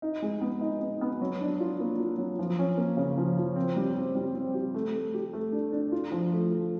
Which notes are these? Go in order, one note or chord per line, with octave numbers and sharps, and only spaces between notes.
D#4
G#3
B3
D#4
B3
B3
F#3
D4
F4
A#3
F4
F#3
F3
C#4
A#3
C#3
F3
F3
C4
G3
C4
G3
C4
G4
A3
A3
G4
A3
D4
D4
F4
F3
A3
F3